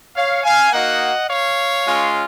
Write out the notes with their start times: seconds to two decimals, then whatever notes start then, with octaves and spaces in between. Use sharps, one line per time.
0.16 C#5 F5
0.44 F5 G#5
0.72 A#3 D#4 F#4 D#5 F#5
1.28 C#5 F5
1.85 G#3 C#4 F4